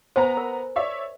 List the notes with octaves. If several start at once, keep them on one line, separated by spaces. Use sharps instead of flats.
B3 C5 G#5 A#5
A#4
C#5 D5 E5